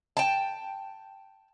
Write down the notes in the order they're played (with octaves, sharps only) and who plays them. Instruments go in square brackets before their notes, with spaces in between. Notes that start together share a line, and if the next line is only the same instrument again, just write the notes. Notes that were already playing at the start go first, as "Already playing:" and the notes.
[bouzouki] G5 A5